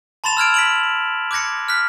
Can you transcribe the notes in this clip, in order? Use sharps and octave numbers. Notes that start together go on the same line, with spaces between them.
A5 B5 C6 A6 E7 F7
E6 F6 G#6 D7
B6 D7 F#7
D6 F#6 G#6 A#6 C#7
F6 F#6 B6